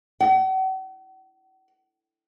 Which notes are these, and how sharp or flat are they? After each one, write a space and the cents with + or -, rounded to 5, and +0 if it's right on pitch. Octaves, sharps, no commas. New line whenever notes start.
F#5 +45